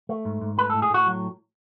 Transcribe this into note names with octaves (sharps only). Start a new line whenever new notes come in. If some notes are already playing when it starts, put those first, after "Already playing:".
A3
G#2
G#2
A3 B4
A2 A4
G#4
A2 F#4
F#3